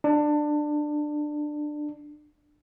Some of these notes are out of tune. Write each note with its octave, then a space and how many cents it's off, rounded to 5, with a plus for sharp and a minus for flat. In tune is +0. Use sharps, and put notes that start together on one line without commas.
D4 +20